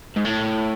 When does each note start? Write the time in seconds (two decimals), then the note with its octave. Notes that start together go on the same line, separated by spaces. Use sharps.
0.16 G#2
0.25 A2